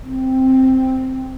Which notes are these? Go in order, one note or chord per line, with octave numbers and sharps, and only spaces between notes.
C4